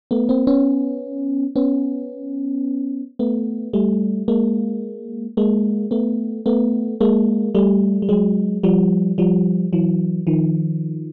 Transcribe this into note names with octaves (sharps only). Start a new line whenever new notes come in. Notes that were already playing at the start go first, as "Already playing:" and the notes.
A3 B3
A#3 C4
B3 C#4
B3 C#4
A3 B3
G3 A3
G#3 A#3
G#3 A#3
A3 B3
A3 B3
G#3 A#3
G3 A3
G3
F#3 G#3
F3 G3
F3 G3
E3 F#3
D#3 F3